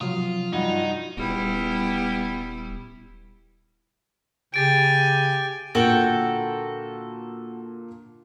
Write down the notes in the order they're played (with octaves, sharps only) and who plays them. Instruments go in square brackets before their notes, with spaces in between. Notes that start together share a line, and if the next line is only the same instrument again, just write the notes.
[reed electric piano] C3 F3 F#3 [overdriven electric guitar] F4 [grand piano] D#6
[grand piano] G2 F#4 [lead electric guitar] D#4
[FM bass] D#1 [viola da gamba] G3 B3 E4
[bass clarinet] C#3 [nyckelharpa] G4 G#5 [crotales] A6 D7
[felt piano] A#2 D3 A#3 [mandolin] F#4 A4 G5